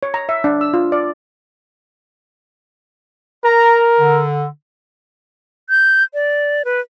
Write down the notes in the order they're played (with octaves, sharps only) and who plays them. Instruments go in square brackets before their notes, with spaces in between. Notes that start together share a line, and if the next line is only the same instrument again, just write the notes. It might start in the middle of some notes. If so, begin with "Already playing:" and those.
[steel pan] C#5
A#5
E5
D4
E6
F4
D5
[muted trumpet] A#4 [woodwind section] A#5
[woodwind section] D3
[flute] G6
D5
B4